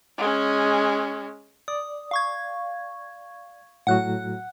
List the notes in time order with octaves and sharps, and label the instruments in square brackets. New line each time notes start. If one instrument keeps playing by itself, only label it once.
[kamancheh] G#3 C#4
[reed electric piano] D5 [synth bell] D#6
[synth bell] F5 C#6 G#6
[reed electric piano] A2 F#3 F#4 [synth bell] F#5 F#6